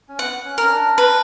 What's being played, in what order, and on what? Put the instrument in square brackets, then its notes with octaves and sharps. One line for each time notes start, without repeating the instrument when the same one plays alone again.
[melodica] C#4
[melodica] B3 [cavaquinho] F#5
[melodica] C#4
[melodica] C#4 [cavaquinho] A#4
[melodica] D4
[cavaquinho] B4